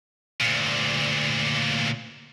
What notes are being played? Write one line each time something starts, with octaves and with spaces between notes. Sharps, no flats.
D2 A#2